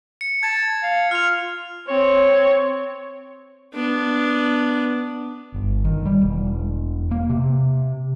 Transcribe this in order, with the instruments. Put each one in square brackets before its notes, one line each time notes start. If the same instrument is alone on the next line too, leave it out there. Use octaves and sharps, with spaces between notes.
[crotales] C#7
[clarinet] A5 [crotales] G#6
[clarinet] F5
[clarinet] F4 [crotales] F6 F7
[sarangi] C4 [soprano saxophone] C#5
[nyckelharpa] B3 D4
[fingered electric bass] G1
D#3
G3
E1
A#3
C3